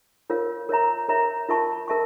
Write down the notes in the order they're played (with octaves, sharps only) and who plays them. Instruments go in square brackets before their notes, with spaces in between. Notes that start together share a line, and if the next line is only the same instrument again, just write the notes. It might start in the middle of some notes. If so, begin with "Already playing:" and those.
[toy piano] F4 A#4 C#5 F5
A#4 C#5 E5 A#5
A#4 C#5 E5 A#5
F4 A#4 E5 A5 C#6
A#4 E5 A5 C#6